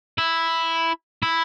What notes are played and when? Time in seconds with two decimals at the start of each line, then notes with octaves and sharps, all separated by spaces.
0.18 E4
1.23 E4